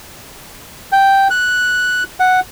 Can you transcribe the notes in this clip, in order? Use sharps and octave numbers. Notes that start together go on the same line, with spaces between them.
G5
F#6
F#5